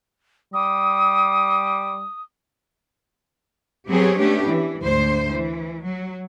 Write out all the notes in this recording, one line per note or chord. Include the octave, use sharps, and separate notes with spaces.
G3 D#6
F#3 B3 C4 G4 G#4 C#5
A3 B3 C#4 D4 G4
E3
D2 G#2 C5
E3
F#3